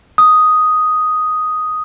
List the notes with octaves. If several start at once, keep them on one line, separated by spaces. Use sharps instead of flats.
D#6